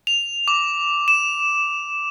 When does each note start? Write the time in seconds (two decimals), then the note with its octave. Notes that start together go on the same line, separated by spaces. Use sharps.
0.07 F7
0.48 D6
1.08 E7